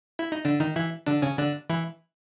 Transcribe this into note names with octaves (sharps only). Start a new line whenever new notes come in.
E4
D#4
D3 D4
D#3 D#4
E3 E4
D3 D4
C#3 C#4
D3 D4
E3 E4